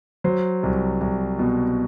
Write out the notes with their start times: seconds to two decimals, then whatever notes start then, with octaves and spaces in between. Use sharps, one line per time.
0.24 F#3 C5
0.63 C2
1.01 C2
1.39 B2